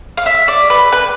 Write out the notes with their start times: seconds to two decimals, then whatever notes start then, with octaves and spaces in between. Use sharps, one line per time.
0.17 F5
0.26 E5
0.48 D5
0.70 B4
0.92 B4